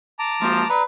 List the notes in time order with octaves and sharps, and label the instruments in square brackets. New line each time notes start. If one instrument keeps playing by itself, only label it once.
[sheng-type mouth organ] A5 A#5 D6
[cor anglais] F3 [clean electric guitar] G#3 A#3 F#4
[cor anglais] B4 [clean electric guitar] D5 A#5